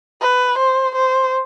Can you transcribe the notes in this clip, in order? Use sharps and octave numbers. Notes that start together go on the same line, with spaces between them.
B4
C5
C5